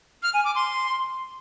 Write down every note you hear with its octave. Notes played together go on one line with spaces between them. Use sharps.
F6
G#5
D6
C6